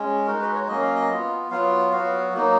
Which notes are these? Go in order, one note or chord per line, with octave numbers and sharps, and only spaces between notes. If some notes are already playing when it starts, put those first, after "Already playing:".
Already playing: G#3 C#4
G#3 D#4 F#4 A#4
B4
C#5
F#3 A#3 C#4 D#5
F5
D#5
B3 F4
F#3 B3 F4 F5
F#3 B3 F#4 F5
F#3 A#3 D#4